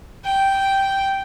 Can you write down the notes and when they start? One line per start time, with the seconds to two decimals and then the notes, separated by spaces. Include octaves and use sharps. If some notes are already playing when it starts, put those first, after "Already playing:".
0.25 G5